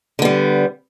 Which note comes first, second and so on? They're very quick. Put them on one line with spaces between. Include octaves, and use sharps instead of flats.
D3 B3 G3